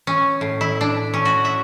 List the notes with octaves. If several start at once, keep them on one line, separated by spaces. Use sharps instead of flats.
C#4
A2
E4
D4
C#4
F#4
E5